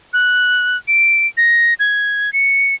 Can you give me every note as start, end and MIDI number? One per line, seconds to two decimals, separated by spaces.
0.13 0.77 90
0.88 1.27 98
1.37 1.74 94
1.80 2.33 92
2.33 2.75 97